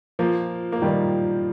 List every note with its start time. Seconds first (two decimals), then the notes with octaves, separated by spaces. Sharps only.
0.19 F3 A#3
0.72 A#3
0.82 D#3 G3